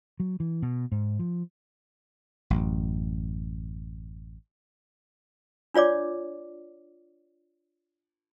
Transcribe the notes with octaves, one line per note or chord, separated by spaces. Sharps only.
F#3
E3
B2
G#2
F3
A1 F#2
D4 F4 C#5 D5 D6